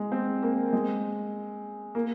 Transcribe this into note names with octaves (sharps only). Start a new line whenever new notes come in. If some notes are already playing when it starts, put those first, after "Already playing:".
Already playing: G#3
C4
A#3
G#3
A#3